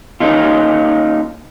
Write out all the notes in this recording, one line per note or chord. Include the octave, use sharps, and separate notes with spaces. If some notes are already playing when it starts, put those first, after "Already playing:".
A#3 C#4 D#4 F4